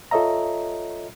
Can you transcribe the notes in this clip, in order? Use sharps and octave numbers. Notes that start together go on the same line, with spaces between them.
F4 A4 C#5 D#5 E5 A#5